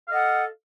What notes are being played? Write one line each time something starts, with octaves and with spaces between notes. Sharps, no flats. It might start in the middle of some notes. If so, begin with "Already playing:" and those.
A4 D#5 F5 F#5